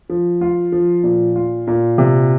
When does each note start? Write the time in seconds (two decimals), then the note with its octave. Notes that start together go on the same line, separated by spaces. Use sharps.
0.10 F3
0.41 F4
0.72 F3
1.04 A#2
1.36 F4
1.67 A#2
1.98 C3